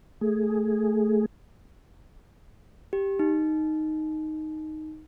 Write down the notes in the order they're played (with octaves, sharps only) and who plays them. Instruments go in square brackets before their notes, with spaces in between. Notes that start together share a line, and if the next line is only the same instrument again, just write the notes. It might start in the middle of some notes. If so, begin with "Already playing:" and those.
[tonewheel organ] A3 G#4
[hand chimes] G4
D#4